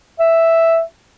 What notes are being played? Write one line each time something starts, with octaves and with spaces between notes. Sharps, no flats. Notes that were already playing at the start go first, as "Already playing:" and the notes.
E5